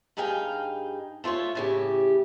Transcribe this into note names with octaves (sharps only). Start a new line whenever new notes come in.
G2 D#4 G#4 F5 G5
A3 F4 A4 C#5
A2 C#3 G4